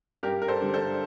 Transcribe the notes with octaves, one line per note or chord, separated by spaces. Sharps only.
G2 G4 A#4
A#4
A4 C5
D3 G3 D4
A4 C5